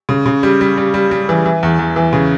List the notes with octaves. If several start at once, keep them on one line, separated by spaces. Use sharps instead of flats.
C#3
C#3
G3
G3
G3
G3
G3
E3
E3
E2
E2
E3
C#3